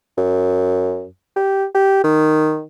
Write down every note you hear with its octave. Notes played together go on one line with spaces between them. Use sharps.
F#2
G4
G4
D#3